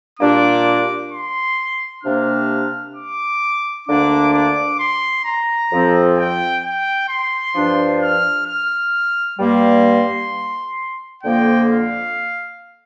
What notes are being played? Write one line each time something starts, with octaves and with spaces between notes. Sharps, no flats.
A#2 G3 A#3 D4 D6
C6
C3 A#3 D4 F6
D6
D2 D3 A#3 D4 D6
D6
C6
A#5
F2 F3 C4
G5
G5
C6
G2 F3 D4
F6
F6
G2 G3 A#3 C6
F2 D3 F3 A#3 G5
F5